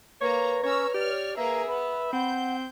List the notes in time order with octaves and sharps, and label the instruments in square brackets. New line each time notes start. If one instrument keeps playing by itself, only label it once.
[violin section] A#3 A#5 [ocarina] B4 [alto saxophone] C#5
[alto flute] C#4 [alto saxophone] C#5 [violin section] A#5 E6
[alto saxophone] G4 [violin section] C#5 F6 [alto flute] D5
[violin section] A#3 G#4 A#4 [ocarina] B4 [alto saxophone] E5 [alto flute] A#5
[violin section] B3 [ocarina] B4 [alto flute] B5
[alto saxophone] C4 [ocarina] F#5 [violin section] G6